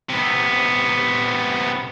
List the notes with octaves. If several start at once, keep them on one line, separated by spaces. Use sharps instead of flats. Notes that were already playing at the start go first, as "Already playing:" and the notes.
C3 B3